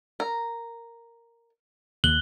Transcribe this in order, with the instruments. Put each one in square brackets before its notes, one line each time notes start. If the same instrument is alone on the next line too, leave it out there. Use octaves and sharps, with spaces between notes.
[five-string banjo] A#4
[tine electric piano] D#2 [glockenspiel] F#6 F#7 G7